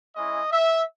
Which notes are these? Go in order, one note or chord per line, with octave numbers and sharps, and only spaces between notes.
G#3 C#4 E4 D#5
E5